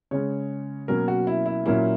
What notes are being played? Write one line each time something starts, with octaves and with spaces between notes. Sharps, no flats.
C#3 G#3 C#4 C#5
B2 F#3 A#3 C#4 A#4
F#4
E4
E4
A#2 F#3 A#3 C#4 E4